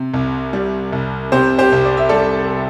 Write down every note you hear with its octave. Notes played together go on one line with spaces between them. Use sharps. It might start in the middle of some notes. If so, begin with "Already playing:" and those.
Already playing: C3
C2
G3
C2
C3 G4 C5
G4 C5
C2
D5
E5
G3 A4 D5